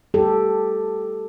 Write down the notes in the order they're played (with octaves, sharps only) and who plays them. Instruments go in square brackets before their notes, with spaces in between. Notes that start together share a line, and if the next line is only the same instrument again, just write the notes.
[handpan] G4 A4